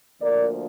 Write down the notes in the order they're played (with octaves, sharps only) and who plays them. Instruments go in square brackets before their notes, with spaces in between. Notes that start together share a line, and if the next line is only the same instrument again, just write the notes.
[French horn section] D2 D3 F3 A#3 A#4 D5